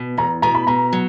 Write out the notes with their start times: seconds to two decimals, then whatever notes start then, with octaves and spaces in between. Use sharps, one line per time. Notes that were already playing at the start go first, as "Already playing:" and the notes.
Already playing: B2
0.18 E2 A#5
0.42 B2 A#5
0.55 B5
0.67 B2 A#5
0.93 F#3